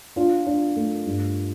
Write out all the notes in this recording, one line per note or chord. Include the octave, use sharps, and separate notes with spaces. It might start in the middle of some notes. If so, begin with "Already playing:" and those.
D4 F4
D4
A3
G2